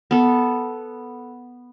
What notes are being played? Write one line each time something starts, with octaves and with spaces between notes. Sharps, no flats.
B3 A4